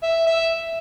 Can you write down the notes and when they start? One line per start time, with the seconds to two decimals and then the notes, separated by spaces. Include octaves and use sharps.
0.03 E5
0.27 E5